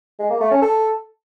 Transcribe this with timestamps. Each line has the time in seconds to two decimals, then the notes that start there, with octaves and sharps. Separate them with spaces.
0.19 G#3
0.30 A#3
0.40 A3
0.51 C#4
0.62 A4